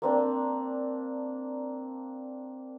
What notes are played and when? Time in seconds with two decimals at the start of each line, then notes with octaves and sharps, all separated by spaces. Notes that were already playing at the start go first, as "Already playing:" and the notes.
0.02 A#3 C4 D4